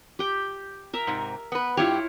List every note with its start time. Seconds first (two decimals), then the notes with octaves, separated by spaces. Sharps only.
0.19 G4 G5
0.93 A#4 E5
1.07 G#2 C3
1.52 B3 B4
1.77 G2 E4 F4 G4 C#5